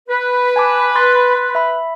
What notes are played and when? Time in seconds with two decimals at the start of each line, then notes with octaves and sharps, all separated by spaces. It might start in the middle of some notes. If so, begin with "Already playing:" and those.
0.09 B4
0.56 G#5 A5 D6
0.95 C6 F#6 A6
1.55 E5 B5